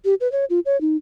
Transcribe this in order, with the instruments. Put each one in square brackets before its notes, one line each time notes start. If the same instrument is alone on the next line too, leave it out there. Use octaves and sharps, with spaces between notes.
[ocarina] G4
B4
C#5
F4
C#5
D#4